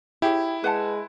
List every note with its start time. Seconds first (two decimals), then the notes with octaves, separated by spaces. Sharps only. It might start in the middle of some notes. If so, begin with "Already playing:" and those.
0.22 E4 G4 G#4 C#5
0.64 G#3 B4 F#5 A5